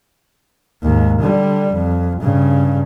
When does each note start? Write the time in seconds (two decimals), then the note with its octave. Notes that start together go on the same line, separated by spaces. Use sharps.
0.83 D#2 G#2
1.20 D3 G3
1.73 F2
2.20 G2 C#3